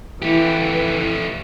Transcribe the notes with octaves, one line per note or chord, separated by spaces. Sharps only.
E3 A3 G4